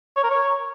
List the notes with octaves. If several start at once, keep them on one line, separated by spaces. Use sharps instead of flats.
C#5
A#4
C#5